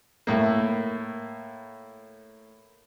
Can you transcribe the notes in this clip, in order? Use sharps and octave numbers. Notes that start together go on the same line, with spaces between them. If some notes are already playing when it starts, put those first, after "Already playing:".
A2 A#3